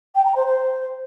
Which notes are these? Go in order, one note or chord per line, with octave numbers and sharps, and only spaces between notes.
G5
A#5
C5
C5